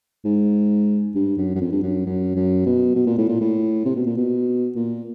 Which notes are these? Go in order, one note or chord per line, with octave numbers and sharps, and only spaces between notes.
G#2
G2
F#2
F#2
F2
G2
F#2
F#2
F#2
B2
B2
A#2
A2
A#2
A2
C3
B2
A#2
B2
A#2